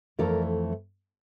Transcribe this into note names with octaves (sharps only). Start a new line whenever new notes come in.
F2 E3 A3 A#4 D5